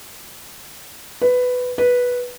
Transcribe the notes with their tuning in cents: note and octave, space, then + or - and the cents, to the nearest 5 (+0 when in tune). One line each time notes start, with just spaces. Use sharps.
B4 +10
B4 -10